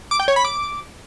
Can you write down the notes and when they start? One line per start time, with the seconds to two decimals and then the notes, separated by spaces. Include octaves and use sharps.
0.11 D6
0.20 G5
0.28 C#5
0.36 B5
0.45 D6